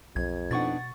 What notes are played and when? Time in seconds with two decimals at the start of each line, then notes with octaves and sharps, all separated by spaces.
0.16 B1 F2 G#6
0.51 B2 B3 D4 D#4 F#5 C#6 A6